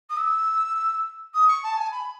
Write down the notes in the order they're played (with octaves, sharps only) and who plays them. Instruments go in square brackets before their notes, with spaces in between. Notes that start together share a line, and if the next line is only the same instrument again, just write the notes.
[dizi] D#6
E6
D#6
C#6
A5
G#5
B5